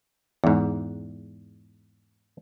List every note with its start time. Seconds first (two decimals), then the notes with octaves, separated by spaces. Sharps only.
0.44 E2 G#2